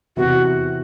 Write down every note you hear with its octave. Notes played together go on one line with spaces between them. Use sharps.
E2 C3 E3 F#4